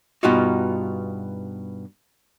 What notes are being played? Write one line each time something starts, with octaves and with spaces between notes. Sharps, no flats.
G2 B2 D#4 F4 F#4